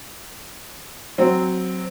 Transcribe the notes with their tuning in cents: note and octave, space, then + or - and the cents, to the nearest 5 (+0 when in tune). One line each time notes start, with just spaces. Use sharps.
F#3 +0 C4 +0